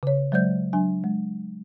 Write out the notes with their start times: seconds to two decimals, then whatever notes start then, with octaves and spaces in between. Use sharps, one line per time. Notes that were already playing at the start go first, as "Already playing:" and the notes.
0.03 C#3 C#5
0.32 F#3 G#3 C5 D5 G6
0.73 F#3 D4 G#5
1.04 G#3